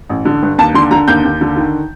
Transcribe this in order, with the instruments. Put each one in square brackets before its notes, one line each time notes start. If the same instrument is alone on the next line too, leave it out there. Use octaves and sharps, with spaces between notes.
[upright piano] A1
D3
G2
D#2 A5
D3 C6
D3 A#5
D#2 G6
D#2
D3
D#3